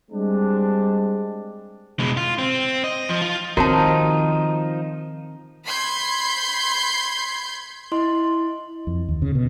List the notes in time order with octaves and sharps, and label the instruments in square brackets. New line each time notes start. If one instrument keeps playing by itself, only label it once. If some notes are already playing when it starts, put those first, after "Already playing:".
[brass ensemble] G3 G#3 C4 D4
[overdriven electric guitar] B2 G#3
F4
C4
D#5
F3
F4
[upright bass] D#3 [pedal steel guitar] F3 D#4 [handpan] C4 A#4 [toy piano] F#4 C#5 A5
[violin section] B5 C6 G6 G#6
[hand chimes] E4 D#5 C6
[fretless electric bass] F2
D#2
C#3
B2